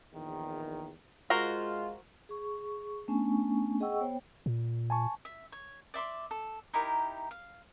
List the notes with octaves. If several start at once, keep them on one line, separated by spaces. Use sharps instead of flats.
A#1 E2 D#3
G#3 F4 F#4 A#4 C5
G#4 C#6
A3 B3 C#4 D4 G#5 C#6
G#4 D#5 F#5 G5 C#6 E6
B3 C5 C#5 G5
A#2
G#5 A5 C#6
E5
C#5
D5 E5 C6 D6
A4
D#4 E4 G4 A#4
F5